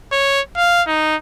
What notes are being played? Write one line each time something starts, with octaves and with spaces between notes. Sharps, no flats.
C#5
F5
D#4